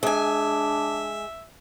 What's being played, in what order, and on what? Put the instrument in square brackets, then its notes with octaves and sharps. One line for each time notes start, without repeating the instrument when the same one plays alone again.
[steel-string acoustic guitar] G#3 G#5 [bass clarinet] D4 [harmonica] E5